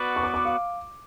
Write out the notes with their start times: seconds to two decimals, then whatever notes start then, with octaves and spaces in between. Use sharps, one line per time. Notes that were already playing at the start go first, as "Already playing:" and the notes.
Already playing: B3 F#4 B4 D5
0.16 C#6
0.23 D6
0.34 D6
0.45 F5